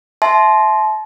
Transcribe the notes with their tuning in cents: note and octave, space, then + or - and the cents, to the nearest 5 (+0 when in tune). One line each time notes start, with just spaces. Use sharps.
E5 -5 A5 -35 C6 -5